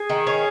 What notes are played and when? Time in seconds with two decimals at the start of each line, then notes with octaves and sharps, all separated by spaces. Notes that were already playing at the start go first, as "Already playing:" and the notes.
Already playing: G#4
0.10 D#3
0.27 C#4